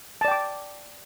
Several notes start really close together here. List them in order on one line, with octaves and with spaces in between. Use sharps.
A5 D5 G5 D6